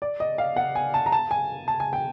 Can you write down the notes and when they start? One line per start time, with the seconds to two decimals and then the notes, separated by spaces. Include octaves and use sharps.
0.02 D5
0.20 D#5
0.38 F5
0.56 F#5
0.75 G#5
0.94 A5
1.06 A#5
1.12 A5
1.31 G#5
1.68 A5
1.80 G#5
1.93 G5